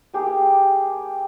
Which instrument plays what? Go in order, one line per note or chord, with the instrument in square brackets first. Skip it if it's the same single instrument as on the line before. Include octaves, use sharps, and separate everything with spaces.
[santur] A#3 G4 G#4